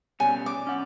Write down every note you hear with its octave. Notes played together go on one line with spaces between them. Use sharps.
B2 G3 C#4 G#5
D6
C#4 F#5